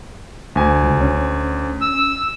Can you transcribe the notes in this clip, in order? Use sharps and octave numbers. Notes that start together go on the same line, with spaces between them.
D2 G#5
C#2
C#4
E6